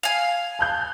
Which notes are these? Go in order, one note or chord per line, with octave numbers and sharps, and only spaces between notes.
F5 G#5
A5 F#6 G6